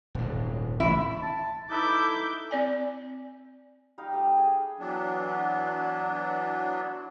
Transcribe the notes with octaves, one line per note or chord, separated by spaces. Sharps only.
D#1 G#2
A1 A2 E4
A5
D#4 E4 A4 B4 D6 G6
C4 D5 G#5
G3 D#4 F5
A3 G4 D#5 G5
G#4 G5
E3 F#3 B3 D4